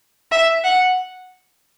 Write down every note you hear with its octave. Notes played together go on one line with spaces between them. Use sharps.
E5
F#5